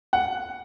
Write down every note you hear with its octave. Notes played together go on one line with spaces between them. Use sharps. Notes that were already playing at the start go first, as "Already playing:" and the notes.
F#5